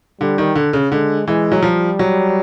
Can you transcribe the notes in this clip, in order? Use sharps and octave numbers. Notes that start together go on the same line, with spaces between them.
D3 G3
D#3
D3
C#3
D3 G#3
E3 G#3
F#3
F3 G3
F#3